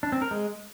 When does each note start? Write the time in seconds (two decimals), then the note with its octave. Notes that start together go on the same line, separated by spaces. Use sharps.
0.03 D4
0.12 C4
0.22 A#4
0.31 G#3